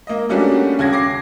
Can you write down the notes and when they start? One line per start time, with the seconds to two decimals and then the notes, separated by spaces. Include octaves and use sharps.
0.07 A#3 D#5
0.29 G3 A3 A#3 C#4 D4 F#4
0.79 D#2 C#3 G#6 A#6
0.93 D6 A#6 C7